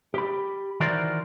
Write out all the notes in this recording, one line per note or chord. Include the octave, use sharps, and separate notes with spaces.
G4 B5
D#3 E3 F#4 A#4 C5 D5